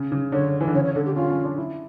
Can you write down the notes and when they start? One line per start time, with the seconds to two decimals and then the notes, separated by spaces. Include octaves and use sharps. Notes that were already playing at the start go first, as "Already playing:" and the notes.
Already playing: C#3
0.12 C#3
0.32 D3 C#5
0.61 E3
0.68 D3
0.74 C#3 C#5
0.85 C#5
0.95 D3 A4
1.06 G4
1.16 C#4 F4
1.30 C#4
1.44 D4
1.58 E4